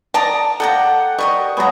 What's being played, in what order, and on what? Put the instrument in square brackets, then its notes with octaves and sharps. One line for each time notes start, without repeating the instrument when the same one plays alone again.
[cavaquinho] D5 A#5 D#6 [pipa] A5
[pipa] A4 [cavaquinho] D5 G5 A#5 [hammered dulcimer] F#5
[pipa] G3 [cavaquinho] A#4 D#5 C#6
[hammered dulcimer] F#3 G#3 B3 [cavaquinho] G#5 A#5